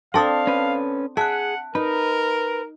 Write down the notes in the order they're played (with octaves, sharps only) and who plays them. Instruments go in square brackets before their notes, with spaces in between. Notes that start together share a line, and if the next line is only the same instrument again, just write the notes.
[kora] C4 D4 [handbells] A4 A5 D#6 [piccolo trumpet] F5
[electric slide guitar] C#4 B4
[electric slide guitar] G#4 [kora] E5 [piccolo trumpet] F#5 [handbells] A5 F#6
[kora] D#4 [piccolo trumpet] A#4 [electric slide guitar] B4